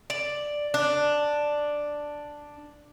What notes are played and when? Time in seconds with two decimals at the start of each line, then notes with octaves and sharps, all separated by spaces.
0.10 D5
0.74 D4